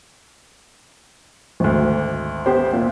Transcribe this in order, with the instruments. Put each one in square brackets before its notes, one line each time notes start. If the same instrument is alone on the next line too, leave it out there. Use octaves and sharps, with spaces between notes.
[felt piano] G#1 D2
[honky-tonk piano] B3 G4 C5
A#2